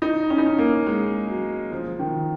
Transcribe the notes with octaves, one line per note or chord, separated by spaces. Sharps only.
D#4
C#4
D#4
C#4
A#3
G#3
F#3
F3
D#3